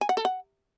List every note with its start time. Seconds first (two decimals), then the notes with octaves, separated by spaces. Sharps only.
0.01 G#5
0.09 F#5
0.17 A4
0.25 F#5